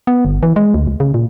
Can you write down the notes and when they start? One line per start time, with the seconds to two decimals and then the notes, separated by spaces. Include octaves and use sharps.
0.07 B3
0.25 G1
0.43 E3
0.56 G#3
0.74 D2
0.87 C#2
1.00 C#3
1.14 A#2